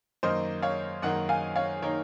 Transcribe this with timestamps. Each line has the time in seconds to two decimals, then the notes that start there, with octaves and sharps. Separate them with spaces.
0.23 F#2 D#3 A#3 D#4 C5 D#5
0.62 C#5 F5
1.02 F#2 D#3 A#3 D#4 D#5 F#5
1.29 F5 G#5
1.56 C#5 F5
1.82 D#3 A#3 D#4 A#4 C#5